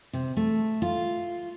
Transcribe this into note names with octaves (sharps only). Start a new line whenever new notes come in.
C3
A3
F4